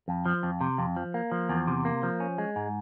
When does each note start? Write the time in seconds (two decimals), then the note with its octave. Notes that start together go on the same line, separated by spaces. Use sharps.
0.08 F2
0.26 F3
0.43 F2
0.61 C3
0.78 F2
0.96 F3
1.14 A#3
1.32 F3
1.49 E2
1.67 C3
1.85 A#3
2.03 F3
2.20 C#4
2.38 G#3
2.56 G#2